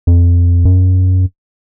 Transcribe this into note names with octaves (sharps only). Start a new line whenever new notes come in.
F2
F#2